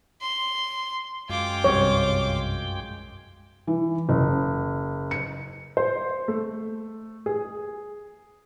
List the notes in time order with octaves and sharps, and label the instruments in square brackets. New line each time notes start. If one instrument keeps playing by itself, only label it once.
[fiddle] C6
[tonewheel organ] F#2 G#3 G5 [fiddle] F4 D6
[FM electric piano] B1 G2 C3 [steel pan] C#5
[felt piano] E3
F#1
C#7
[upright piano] C5
A3
G#4